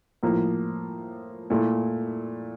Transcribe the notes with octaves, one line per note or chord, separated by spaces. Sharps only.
A2 F3 A#3
A#2 A3 E4